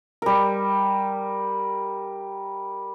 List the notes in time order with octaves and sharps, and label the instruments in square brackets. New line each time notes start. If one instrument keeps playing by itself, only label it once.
[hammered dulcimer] G3 A#4